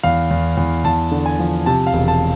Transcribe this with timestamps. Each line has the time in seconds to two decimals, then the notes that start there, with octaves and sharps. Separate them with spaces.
0.03 E2 F5
0.31 E2
0.57 E2
0.84 E2 A5
1.11 D3
1.26 G#5
1.39 F3
1.66 C3 A5
1.87 F5
1.93 E1
2.08 A5